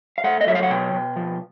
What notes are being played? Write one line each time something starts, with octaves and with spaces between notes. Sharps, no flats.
F5
A3 F#5
D#5
F#3 E5
F5
F#5
B2 G5
B2
F3